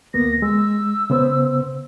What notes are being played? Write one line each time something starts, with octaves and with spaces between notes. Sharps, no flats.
D2 A#3 B3 A#6
G#3 E6
C#3 B3 C5